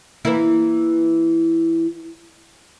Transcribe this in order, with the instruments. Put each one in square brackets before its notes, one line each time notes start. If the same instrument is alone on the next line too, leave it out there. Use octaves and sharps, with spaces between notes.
[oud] E3 A#3 E4